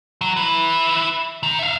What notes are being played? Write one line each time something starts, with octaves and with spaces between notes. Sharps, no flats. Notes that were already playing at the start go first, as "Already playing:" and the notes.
F#3
E4 B4
D#3
E5 F5